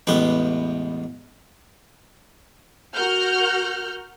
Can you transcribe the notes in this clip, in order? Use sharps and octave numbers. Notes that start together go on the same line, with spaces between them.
A1 E2 G#3 B4 G5 D#6
F#4 A#4 F#5 F6 G6